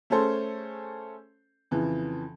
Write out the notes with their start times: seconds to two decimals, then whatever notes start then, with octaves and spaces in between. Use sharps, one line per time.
0.10 A3 C#4 G#4 A4 C5
1.71 F2 C#3 E3